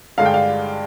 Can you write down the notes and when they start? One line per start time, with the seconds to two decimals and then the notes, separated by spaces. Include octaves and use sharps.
0.18 G2 D3 G#3 D4 F5
0.25 G5
0.34 F5